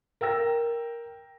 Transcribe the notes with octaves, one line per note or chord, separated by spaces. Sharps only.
A#4 G5 E6 A#6